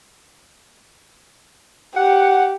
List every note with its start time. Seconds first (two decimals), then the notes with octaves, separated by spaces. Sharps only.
1.96 G4 F#5